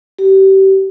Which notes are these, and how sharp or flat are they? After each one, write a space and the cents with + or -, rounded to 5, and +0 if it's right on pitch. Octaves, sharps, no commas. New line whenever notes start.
G4 -30